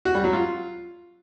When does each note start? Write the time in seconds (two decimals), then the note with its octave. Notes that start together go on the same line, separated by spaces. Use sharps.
0.05 F#4
0.15 G3
0.24 F#3
0.33 F4